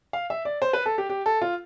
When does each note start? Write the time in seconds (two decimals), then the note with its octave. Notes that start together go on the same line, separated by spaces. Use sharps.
0.13 F5
0.30 E5
0.45 D5
0.62 C5
0.73 B4
0.86 A4
0.98 G4
1.10 G4
1.26 A4
1.42 F4